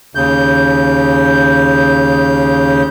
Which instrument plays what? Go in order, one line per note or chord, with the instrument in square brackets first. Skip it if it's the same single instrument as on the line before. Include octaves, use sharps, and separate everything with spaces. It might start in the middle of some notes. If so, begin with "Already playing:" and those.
[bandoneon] D#2 C#3 G6